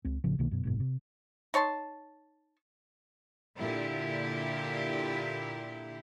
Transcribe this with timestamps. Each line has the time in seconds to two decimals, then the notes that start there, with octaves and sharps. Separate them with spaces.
0.05 C#2 C4
0.24 A1 C#3 F3
0.38 C2 B2 D#3 A#3
0.51 F#2 B2
0.63 F#1 G#2 B2
0.80 C3
1.54 D#4 C#5 A5 C6
3.60 A#2 D3 E4 G4